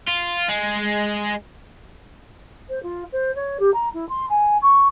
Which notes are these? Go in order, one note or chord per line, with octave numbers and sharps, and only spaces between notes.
F4
G#3
C5
F4
C5
C#5
G4
A#5
E4
C6
G#5
C#6